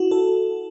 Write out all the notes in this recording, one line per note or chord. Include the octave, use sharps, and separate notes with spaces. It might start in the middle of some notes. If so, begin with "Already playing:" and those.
Already playing: E4 F#4
A4